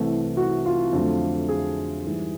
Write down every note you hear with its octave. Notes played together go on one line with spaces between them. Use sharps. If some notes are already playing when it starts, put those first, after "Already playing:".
Already playing: C2 C3 E3 A3
F#4
F4
F2 D3 F#3 A3
G#4
G#2 E3 G3